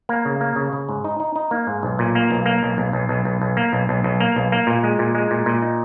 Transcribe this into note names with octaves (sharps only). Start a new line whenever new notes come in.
A#3
C#3
A#3
C#3
C#3
G#2
D#4
D#4
D#4
A#3
G#2
B1
A#2
A#3
B1
A#3
B1
B1
B1
B1
B1
B1
A#3
B1
B1
B1
A#3
B1
A#3
A#2
G#3
A#2
G#3
A#2
A#2
D#4